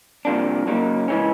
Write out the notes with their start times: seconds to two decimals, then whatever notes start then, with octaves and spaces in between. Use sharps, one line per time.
0.25 C2 C3 F3 A#3 D4
0.67 C#3 F#3 A#3 D#4
1.08 C#3 E3 G#3 C#4